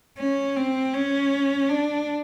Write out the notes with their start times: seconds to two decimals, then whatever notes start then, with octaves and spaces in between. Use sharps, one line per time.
0.18 C#4
0.56 C4
0.94 C#4
1.69 D4